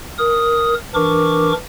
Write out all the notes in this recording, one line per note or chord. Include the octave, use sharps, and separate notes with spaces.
A#4 D#6
E3 D4 A#4 C#6 D6